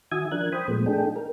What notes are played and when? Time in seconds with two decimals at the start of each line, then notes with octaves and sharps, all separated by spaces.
0.11 D#3 F#4 E5 G#5 D#6 G#6
0.31 F3 D4 A#4 F#6 G#6
0.52 C5 G5 B5 D#6
0.68 A#2 F3 G#3 A3 B3
0.86 A3 D4 D#4 G#4 A4 G5
1.16 A#4